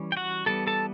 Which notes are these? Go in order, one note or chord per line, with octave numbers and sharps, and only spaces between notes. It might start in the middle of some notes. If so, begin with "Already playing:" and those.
Already playing: E3 G3 C#4
G5
F#4 F#5
E3 G3 B3 A4 A5
A4 A5